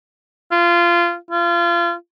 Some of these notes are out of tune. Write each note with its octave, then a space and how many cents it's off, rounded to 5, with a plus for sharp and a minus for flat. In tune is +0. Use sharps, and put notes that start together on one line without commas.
F4 -20
F4 -30